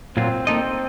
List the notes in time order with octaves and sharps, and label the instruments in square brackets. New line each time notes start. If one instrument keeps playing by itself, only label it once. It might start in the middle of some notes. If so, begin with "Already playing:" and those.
[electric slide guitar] A#2 F#3 A#3 F4 [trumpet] C4
[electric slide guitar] A#3 D#4 A4 D#5 [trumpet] C4